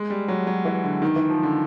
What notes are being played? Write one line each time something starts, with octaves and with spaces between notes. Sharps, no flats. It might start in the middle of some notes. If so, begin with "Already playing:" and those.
Already playing: G#3
G3
F#3
F#3
E3
D3
D#3
E3
F3
D3